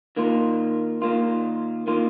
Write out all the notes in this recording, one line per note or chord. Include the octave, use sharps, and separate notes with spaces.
D#3 A#3 F4
D#3 A#3 F4
D#3 A#3 F4